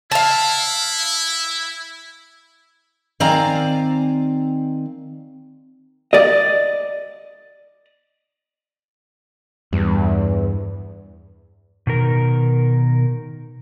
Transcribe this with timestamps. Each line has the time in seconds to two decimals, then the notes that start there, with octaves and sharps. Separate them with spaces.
0.11 E4 F5 A5
3.20 D#3 C4 D5 F5 G#5 A#5
6.13 D5 D#5
9.73 E2 G2
11.87 B2 D#3 A#4